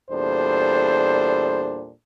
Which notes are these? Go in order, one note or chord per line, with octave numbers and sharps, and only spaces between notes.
E2 A#2 G3 D4 A4 C5